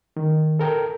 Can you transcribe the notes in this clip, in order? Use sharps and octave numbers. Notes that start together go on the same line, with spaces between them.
D#3
A4 A#4 G5